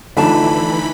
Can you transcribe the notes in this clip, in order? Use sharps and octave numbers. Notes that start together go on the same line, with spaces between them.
D3 E3 F3 A3 D4 D#4 A5 B5